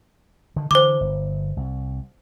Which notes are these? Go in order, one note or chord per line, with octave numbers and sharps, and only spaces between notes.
D3 D#3
D3 E3 C5 D6
G1
C2